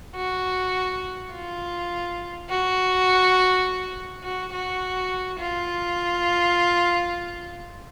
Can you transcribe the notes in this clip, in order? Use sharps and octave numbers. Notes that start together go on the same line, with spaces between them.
F#4
F4
F#4
F#4
F#4
F4